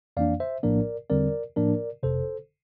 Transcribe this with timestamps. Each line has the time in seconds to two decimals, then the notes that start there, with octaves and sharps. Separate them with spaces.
0.17 F2 E3 A#3 D4 D5 F5
0.40 C5 E5
0.63 A#1 A2 F3 A#3 D4 A#4 D5
1.10 E2 D3 G3 C4 A#4 D5
1.56 A2 F3 A#3 D4 A#4 D5
2.03 G1 F2 C3 A4 C5